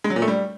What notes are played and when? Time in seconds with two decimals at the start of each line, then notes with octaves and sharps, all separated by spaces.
0.04 G#3
0.10 F#3
0.16 A#2
0.22 A3
0.28 G3